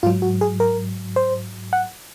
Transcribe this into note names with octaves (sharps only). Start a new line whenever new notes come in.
G#2 F#3 F4
F#4
G#4
A#4
C5
F#5